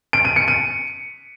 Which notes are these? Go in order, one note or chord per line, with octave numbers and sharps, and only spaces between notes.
D7
D#7
C#7
D#7